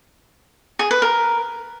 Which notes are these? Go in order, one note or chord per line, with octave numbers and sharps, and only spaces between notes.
G#4
B4
A#4